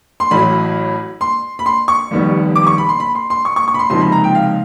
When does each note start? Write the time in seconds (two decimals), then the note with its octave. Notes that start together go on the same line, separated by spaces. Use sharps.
0.20 C6
0.31 A1 A2 F#3 B5
1.21 C6
1.59 B5
1.66 C6
1.88 C#6
2.11 F1 D#2 D#3 G3 B3
2.56 D6
2.67 C#6
2.78 B5
2.89 C6
3.00 B5
3.15 C6
3.30 C6
3.45 C#6
3.56 C#6
3.68 C#6
3.74 B5
3.79 C6
3.90 C#2 C3 F3 A#3 D#4 C6
4.01 B5
4.12 A#5
4.24 G5
4.35 F5